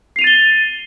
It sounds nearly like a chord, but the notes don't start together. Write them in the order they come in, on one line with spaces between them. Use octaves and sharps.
C7 F7 D#7 A6 G7